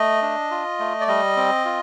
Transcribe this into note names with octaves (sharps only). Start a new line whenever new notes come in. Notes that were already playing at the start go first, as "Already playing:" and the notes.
Already playing: A3 D#5
D4
F4
A3
D5
G3 D#5
C4
F4